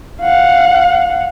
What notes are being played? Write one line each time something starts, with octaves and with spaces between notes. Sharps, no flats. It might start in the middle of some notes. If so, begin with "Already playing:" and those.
F5 F#5